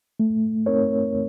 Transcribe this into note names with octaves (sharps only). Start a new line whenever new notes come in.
A3
C4 D#4 A#4 C#5